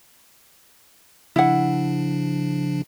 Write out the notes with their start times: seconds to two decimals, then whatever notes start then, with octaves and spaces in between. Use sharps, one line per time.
1.36 C#3 F3 D4 E4 F#5